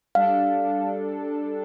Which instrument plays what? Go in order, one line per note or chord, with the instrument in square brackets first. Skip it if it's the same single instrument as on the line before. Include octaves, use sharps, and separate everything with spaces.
[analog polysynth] G3 D4 A4 [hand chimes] F5